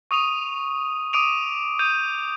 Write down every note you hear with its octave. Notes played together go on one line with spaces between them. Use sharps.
C#6 D#6 D#7 F7
D6 D#6 D7 D#7 F7
D#6 G6 D#7